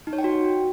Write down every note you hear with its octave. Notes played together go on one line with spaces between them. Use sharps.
D#4
C#5
G5
F#4